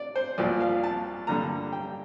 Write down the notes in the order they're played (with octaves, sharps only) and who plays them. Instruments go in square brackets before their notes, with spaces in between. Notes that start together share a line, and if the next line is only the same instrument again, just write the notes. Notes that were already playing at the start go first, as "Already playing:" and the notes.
Already playing: [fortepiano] D5
C5
C2 A#2 F3 D5
F5
A5
G2 D3 G3 A#3 A#5
G5